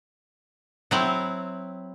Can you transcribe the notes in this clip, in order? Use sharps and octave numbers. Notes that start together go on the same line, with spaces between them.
F#3 C4 E4